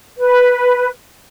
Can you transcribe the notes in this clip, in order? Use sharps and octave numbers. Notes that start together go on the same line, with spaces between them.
B4